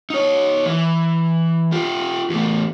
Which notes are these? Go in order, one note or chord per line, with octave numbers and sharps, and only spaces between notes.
D#4 C#5
E3
F4 G4
E2 A3